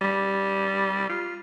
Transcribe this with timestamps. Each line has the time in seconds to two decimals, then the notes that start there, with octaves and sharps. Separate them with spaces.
0.01 G3
1.09 F4